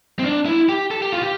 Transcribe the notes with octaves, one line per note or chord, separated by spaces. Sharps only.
C4
D4
E4
G4
A4
G4
F4
G4